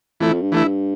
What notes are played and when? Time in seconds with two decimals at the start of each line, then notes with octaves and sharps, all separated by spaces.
0.20 F2 E3 A3 E4
0.31 F2
0.41 G2
0.52 E3 A3 E4